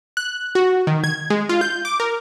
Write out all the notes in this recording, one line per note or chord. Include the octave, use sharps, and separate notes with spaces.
F#6
F#4
D#3
G#6
G#3
F4
G6
D6
A#4